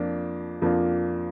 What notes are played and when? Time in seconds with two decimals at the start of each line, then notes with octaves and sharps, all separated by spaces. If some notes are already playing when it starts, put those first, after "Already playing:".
Already playing: F2 F3 A#3 D4
0.62 F2 F3 A#3 D4